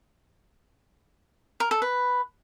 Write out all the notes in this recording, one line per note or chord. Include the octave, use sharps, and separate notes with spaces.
A#4
A4
B4